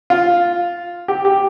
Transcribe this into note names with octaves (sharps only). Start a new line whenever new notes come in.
F4
G4
G4